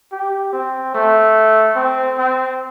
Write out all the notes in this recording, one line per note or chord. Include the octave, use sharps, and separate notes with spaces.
G4
C4
A3
C4
C4